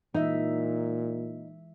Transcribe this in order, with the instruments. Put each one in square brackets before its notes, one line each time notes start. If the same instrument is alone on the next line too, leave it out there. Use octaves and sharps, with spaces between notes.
[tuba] A#2 [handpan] E3 G#3 E5 [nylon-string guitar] D#4